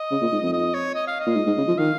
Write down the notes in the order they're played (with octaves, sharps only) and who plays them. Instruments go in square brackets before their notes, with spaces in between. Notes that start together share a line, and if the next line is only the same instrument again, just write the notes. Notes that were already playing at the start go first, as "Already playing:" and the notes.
Already playing: [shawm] D#5
[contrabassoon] C#3
A#2
G#2
F2
[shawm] D#5
C#5
D#5
F5
D#5
[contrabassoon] A#2
G#2
G#2
C#3
F3
[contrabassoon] D#3 [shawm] F5